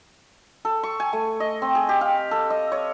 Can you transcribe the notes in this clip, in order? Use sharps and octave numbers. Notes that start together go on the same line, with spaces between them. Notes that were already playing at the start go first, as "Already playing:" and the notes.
A4
C#6
G#5
A3
D#5
C4
G#4
G4
F5
A4
D#5
C#5